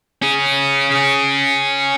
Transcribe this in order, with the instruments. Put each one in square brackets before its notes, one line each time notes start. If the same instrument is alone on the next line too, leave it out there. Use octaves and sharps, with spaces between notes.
[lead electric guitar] C#4 G#4